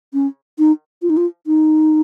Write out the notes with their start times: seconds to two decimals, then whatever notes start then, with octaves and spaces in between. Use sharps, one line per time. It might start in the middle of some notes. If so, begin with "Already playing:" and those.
0.13 C#4
0.58 D#4
1.02 F4
1.10 D#4
1.17 F4
1.47 D#4